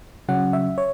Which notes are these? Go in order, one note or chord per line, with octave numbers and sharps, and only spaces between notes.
C#3 F#3 C#4 F#5
E5
C#5